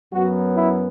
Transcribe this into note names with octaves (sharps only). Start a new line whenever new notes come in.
F#2 F#3 B3 F#4
E4